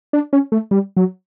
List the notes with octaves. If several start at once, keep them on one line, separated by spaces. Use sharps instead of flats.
D4
C#4
A3
G3
F#3